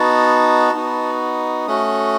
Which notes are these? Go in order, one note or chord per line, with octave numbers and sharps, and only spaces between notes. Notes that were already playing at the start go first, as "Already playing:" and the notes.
Already playing: B3 D#4 F#4 A5
B3 D#4 F#4
A3 C#4 F#4 D#6